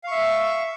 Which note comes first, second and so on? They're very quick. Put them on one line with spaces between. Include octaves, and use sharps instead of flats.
F5 C#6 E5